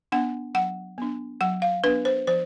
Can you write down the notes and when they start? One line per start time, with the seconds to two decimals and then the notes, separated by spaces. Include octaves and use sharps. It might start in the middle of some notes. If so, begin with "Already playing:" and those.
0.12 B3 D4 F#5
0.55 F#3 F#5
0.98 B3 D4
1.41 F#3 F#5
1.62 F5
1.84 B3 D4 B4
2.05 C5
2.27 F3 C5